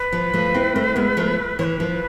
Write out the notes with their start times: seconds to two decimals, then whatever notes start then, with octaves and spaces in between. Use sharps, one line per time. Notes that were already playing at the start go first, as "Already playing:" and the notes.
Already playing: B4
0.12 F3
0.33 F3 A3
0.54 C4 E4
0.76 A3 C4
0.96 G#3 B3
1.17 F3 A3
1.59 E3 C#5
1.64 B4
1.80 F3